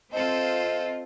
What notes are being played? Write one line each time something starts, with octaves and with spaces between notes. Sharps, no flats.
C4 F4 A4 C5 D#5